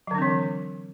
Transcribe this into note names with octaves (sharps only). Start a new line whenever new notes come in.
D3 E3 F#3 C4 D4